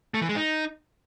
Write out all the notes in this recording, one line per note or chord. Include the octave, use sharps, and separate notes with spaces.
A3
E3
G#3
D#4